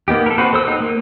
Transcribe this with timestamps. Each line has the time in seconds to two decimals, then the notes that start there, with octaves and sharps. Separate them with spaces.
0.08 A#3 B3 D#4 G4
0.26 A4 A#4
0.38 C4 F#4 G4 B4
0.53 A4 C5 E6
0.67 D#4
0.80 A#3